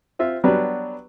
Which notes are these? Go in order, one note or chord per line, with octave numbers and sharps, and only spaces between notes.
C4 F4 E5
F#3 G3 B3 D4 B4